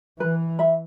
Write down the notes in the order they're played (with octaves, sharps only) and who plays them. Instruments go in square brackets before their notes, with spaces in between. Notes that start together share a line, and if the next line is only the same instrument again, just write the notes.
[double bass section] E3 [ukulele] B4
[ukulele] E5 B5